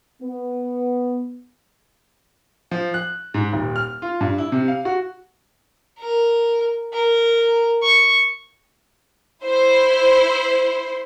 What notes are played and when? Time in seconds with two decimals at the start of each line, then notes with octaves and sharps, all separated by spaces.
0.22 B3
2.71 F3
2.94 F#6
3.34 G#2
3.53 D#1
3.76 F6
4.02 F4
4.21 G2
4.38 E4
4.52 C3
4.68 F5
4.85 F#4
5.99 A#4
6.93 A#4
7.83 C#6
9.43 E4 C5